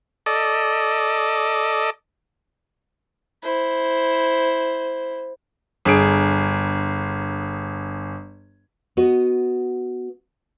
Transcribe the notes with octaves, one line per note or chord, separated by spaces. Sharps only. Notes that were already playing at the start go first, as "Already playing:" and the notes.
A4 D5 D#5
E4 C5
G1 G#4 D7
B3 F#4 D#5